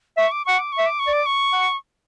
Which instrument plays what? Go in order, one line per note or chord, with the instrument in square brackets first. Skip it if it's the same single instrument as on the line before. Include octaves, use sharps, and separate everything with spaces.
[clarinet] E5 [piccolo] C#6
[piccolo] D6
[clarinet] F#5 [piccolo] C#6
[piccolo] D6
C#6
[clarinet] E5
[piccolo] D6
C#6
[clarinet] D5
[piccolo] D6
C#6
[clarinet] F#5